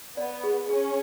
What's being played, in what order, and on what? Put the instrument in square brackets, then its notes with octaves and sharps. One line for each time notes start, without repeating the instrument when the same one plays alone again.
[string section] B3 [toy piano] D5
[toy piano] G#4
[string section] C#4 [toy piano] G#4